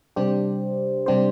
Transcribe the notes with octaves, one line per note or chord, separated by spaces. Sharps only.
C3 G3 D4 G4 C5
C3 G3 D4 G4 C5